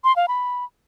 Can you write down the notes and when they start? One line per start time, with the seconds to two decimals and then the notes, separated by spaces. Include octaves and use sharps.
0.04 C6
0.16 F5
0.28 B5